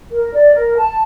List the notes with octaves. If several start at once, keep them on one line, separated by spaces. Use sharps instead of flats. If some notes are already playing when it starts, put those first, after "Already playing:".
A#4
D5
A#4
A5